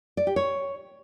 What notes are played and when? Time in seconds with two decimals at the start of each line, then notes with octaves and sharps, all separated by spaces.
0.17 D5
0.27 G4
0.36 C#5